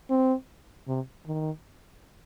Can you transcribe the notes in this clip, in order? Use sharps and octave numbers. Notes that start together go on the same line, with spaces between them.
C4
C3
D#3